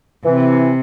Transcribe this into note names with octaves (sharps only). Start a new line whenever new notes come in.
C3 E3